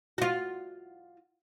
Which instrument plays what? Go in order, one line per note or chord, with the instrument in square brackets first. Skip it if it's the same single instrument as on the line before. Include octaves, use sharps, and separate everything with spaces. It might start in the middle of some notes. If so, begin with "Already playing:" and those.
[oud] F4 F#4